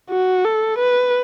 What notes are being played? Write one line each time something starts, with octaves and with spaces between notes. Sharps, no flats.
F#4
A4
B4